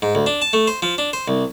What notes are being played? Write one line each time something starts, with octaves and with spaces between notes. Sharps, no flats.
G#2
D2
D4
A5
A3
C5
F3
D4
C5
C2